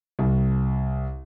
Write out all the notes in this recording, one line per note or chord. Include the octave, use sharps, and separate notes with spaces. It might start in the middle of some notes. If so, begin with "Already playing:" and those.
C2